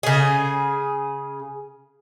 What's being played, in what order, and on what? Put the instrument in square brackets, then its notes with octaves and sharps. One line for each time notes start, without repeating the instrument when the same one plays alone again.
[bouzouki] C#3 G#4